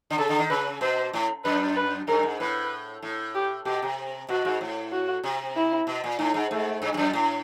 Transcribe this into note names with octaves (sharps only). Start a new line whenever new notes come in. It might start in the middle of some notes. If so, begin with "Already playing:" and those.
D3
C#3 A4
D3
D#3
C#3 B4
B2 C5
A2
F#2 B4
B4
G2 A#4
G#2
A2 B4
A2
G4
B2 G4
C3
B2 F#4
G#2
A2
F#4
C3
E4
B2
A#2
A2 D#4
G#2
G#2 A3
G2
G2
F#2
A2